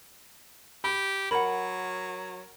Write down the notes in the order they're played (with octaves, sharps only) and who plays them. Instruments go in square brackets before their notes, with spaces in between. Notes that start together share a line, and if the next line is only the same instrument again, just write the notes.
[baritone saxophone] G4 [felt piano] B5
[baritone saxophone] F#3 [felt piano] A#4 [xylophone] F#5 B5